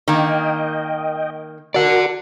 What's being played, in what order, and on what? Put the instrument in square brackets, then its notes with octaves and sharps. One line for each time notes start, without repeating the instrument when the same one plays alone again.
[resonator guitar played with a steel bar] D#3 A#3 [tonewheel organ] D#5 G5
[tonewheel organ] F#4 A#4 [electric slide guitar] D5 F#5